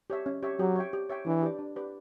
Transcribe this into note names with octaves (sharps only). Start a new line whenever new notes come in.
G4 C#5 E5
C#4
G4 C#5 E5
F#3 G4
C#5 E5 G5
G4
C#5 E5 G5
E3 D4
G4 B4 D5
D4
G4 B4 D5